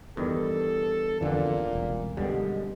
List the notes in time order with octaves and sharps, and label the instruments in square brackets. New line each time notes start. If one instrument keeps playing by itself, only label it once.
[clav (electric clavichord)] E2 G2 D#3 [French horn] A4
[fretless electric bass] F2 D3 E3 [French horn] A#2
[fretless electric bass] E1 C2
[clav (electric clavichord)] F#2 B2 D3 [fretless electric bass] G3 [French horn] G#3